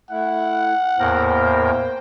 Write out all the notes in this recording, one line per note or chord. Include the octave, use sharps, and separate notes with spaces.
A3 E4 F#5
E2 A2 A#3 A#4 C5 G5